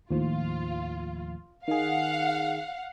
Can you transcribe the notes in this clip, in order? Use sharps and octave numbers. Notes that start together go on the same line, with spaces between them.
D#2 A2 F3 F4
D#3 G#4 F5 F#5